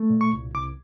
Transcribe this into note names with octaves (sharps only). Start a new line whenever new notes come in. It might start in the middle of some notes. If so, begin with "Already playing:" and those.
Already playing: A3
A#2
C#6
C2
C2 D6